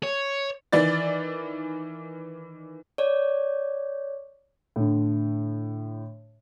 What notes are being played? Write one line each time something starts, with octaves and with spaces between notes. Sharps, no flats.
C#5
D#3 E3 D5 A6
C#5 D5
A2 D3